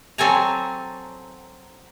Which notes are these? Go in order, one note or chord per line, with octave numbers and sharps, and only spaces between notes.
F#3 C4 A4 G#5 A#5